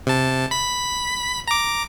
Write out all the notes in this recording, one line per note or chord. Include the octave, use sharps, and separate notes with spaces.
C3 A5
B5 B6
A#5 D6